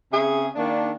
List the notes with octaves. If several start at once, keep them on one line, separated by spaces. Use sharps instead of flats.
C#3 C4 G#4 E5 G#5
D#3 A#3 D4